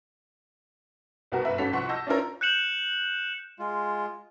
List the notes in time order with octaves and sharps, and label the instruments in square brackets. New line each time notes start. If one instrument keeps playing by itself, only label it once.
[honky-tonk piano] C2 B2 B3 F#4 G4 A#4
G1 B4 E5
G#1 C#4 F#4 A4 B6 F7
C2 F3 F#5 C6 C#6
D#5 A5 E6 G6 A#6
C#4 D4 E4 F4 A#4 C#5
[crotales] F#6 G6 C#7 E7 F#7
[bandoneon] G#3 F4